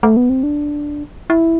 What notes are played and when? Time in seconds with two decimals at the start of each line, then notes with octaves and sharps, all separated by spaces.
0.03 A3
0.17 B3
0.30 C4
0.43 D4
1.30 E4